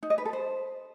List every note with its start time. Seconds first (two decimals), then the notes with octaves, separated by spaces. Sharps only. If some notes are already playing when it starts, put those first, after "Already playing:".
0.03 D#4
0.10 D#5
0.18 B4
0.25 A4
0.33 C5